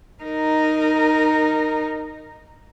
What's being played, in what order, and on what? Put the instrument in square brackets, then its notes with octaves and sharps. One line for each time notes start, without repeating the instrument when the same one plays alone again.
[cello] D#4 A#4